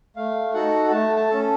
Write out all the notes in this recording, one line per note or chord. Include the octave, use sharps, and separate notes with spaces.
A3 F5
D#4 F#4 A4 F#5
A3 A5
A5
C#4 A4